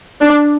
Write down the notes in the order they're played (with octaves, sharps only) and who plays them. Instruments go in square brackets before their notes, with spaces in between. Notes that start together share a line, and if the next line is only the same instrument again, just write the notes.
[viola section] D4